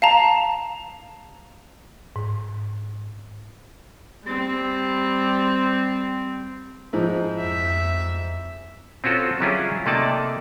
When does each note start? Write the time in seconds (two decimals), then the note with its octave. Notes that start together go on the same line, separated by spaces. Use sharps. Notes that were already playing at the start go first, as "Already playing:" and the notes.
0.02 F5 A5 A#5
2.16 G#2
4.25 G3 C4
6.93 G#2 F3 E4
7.39 F2 E5
9.04 C4 C#4 F4 F#4 A4
9.40 F#3 G3 C#4 E4 F4 G#4
9.86 C3 A3 A#3 D#4 D5 A5